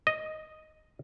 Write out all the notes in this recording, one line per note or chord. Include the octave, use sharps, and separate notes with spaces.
D#5